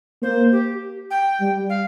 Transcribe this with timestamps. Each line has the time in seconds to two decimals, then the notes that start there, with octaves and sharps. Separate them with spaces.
0.22 A#3 C5
0.52 G4
1.11 G5
1.40 G3
1.69 F5